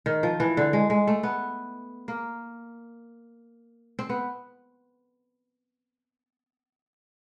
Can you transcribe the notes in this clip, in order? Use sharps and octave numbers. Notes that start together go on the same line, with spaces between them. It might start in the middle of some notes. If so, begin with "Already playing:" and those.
D#3
F3
E3
D3
G#3
G#3
A3
B3
A#3
C4
B3